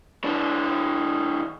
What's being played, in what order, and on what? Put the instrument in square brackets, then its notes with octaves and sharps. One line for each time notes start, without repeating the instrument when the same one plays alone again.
[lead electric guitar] E3 D4